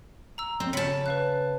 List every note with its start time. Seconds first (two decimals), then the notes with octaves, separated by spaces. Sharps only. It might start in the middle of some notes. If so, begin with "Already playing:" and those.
0.38 A#5 E6
0.60 C4
0.73 C#3 A5 C#7 F#7
1.06 B4 F5 F#6